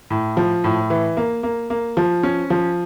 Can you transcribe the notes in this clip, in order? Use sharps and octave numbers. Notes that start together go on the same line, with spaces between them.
A2
F3
A2
E3
A#3
A#3
A#3
F3
C#4
F3